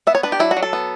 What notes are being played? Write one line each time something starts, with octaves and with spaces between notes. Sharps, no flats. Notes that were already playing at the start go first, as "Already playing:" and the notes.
B3 E5
C#5
D4 B4
G4
F#3 E4
F#4
F#3
A4
B3